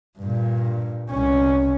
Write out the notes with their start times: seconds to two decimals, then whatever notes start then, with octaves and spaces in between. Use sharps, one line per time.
0.19 G2 A#2
1.11 C2 C#4